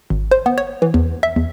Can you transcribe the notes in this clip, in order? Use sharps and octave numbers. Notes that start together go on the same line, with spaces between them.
G#1
C5
B3
C#5
E3
E2
E5
E2